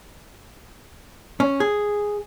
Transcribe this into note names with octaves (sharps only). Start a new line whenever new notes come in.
C#4
G#4